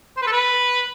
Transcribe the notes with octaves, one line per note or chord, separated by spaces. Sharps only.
C5
B4
A4
B4